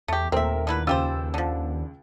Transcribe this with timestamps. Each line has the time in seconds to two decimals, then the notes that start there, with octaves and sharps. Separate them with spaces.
0.08 E2 A3 G4
0.32 D#2 A#2 A3 C4 A#4 E5
0.67 D3 E4 B4
0.87 C#2 F4 G4 C5 E6 A6
1.34 D3 F3